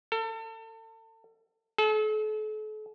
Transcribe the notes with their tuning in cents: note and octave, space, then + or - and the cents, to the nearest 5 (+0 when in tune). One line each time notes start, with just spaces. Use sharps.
A4 +35
A4 -40